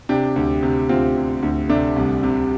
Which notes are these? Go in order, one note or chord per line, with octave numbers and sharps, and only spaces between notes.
C3 D4 G4
D2
C3
D2 C4 F4
C3
D2
C3 A3 D4
C2
C3